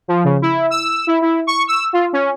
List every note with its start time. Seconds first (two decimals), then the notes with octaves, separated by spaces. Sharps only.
0.08 F3
0.24 C#3
0.42 E4
0.70 E6
1.07 E4
1.22 E4
1.47 C#6
1.68 E6
1.93 F4
2.13 C#4